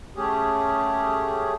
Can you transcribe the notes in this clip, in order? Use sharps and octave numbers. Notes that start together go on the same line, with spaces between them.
A3 C#4 G4 G#4